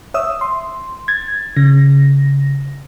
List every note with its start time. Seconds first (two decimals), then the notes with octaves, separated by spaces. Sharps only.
0.14 C#5 E5 D#6 E6
0.41 C6
1.08 G#6 A6
1.57 C#3 A#6